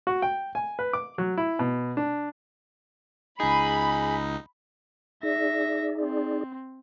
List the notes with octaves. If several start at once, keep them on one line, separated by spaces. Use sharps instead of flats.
F#4
G5
G#5
B4
D6
F#3
E4
B2
D4
C#2 D#4 G#4 B5
D#4 G#4 D5 E5 A#6
C4